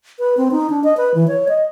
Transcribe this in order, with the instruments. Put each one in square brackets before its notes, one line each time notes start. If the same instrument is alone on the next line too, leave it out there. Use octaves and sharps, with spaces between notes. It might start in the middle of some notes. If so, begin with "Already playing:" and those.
[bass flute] B4
C4
D#4
D4
D#5
B4
E3
C#5
D#5